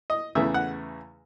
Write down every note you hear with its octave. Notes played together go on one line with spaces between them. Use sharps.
D#5
E2 C#3 E3 A3 E5
F#5